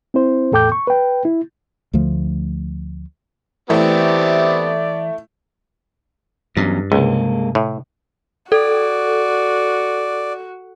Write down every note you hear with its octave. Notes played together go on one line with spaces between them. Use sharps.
C4 E4 C5
E2 A2 A4 G5 D6 G6
C#6
B4 G5
E4
D2 D3 F3 A3
E3 A3 B3 C4 E4 G4 D5
E2 G2 F#3 C#4
C#2 C3 G#3 A#3
A2
F#4 A4 D5